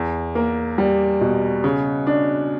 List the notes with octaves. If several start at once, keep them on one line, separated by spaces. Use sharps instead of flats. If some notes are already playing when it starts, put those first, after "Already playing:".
Already playing: E2
A#3
G3
B2
C#3
D4